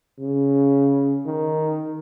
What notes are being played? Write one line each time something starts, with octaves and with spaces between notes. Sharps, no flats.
C#3
D#3